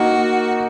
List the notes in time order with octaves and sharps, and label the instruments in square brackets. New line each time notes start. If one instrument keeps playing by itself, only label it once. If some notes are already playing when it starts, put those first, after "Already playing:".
Already playing: [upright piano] A#3 D#4 A#4 [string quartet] F#4